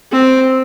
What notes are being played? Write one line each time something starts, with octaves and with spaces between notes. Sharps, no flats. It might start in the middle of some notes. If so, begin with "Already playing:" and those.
C4